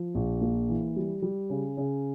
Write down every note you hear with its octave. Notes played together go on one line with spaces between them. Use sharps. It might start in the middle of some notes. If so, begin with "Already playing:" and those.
Already playing: F3
A#1
A#3
E3
G3
G3
C#3
C#3